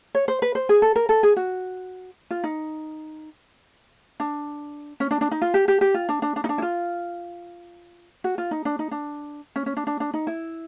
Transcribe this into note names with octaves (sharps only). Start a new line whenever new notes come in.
C#5
C5
B4
C5
G#4
A4
A#4
A4
G#4
F#4
F4
D#4
D4
C#4
D4
D4
D#4
F4
G4
G4
G4
F4
D4
D4
D4
D#4
D4
E4
F4
F#4
F4
D#4
D4
D#4
D4
C#4
C#4
D4
D4
D4
D#4
E4